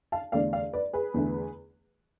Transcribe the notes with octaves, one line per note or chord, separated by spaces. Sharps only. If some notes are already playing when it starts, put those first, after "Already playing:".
F5 A5
E2 D3 A3 D5 F5
D5 F5
B4 D5
G#4 B4
E2 D3 A3